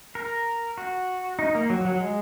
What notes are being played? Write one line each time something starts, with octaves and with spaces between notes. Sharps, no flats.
A#4
F#4
D#4
A#3
F#3
F#3
G#3